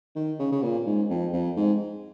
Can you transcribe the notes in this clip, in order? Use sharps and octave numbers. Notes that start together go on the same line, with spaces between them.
D#3
C#3
C#3
A#2
G#2
F2
F2
G#2